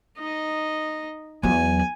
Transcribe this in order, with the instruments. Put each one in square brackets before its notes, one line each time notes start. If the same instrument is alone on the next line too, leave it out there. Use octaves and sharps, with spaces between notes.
[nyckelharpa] D#4 D#5
[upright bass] E2 F#3 [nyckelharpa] G#5